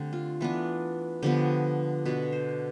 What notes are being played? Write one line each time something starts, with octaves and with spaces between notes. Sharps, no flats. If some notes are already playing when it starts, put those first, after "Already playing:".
Already playing: D3 A3 C4 G4
F4
E3 B3 D4
D3 F3 B3 G4
B2 B3 D4 B4
C5